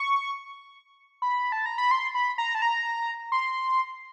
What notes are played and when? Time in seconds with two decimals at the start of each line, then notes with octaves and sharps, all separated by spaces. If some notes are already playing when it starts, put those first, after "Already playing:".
Already playing: C#6
1.22 B5
1.52 A5
1.66 A#5
1.78 B5
1.91 C6
2.15 B5
2.38 A#5
2.55 A5
2.62 A#5
3.32 C6